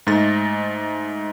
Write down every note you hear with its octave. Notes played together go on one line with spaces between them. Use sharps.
G#2 A3 D#4 A6 A#6